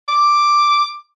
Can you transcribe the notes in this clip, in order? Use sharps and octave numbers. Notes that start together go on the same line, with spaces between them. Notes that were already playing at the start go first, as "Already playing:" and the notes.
D6